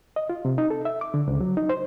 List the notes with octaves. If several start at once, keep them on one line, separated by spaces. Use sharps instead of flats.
D#5
F4
C3
D#4
A4
E5
D6
D3
C#2
F#3
D#4
C5